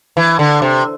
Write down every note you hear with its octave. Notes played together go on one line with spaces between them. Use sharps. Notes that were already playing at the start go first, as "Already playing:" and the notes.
E3
D3
C3